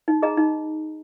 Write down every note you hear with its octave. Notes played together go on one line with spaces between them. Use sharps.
D#4
G#4 D#5 A#5
D#4